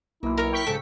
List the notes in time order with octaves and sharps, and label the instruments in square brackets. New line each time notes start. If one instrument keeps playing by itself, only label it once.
[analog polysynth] B1 [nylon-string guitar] A#3 [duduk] E4
[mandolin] A#4 C#5
[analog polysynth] G5 C#6 B6
[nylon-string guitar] G#2 F#3 [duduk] C#3 [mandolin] A4